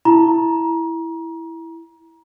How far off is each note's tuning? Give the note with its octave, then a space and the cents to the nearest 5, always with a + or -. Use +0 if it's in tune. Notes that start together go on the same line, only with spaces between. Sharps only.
E4 +0 A#5 +30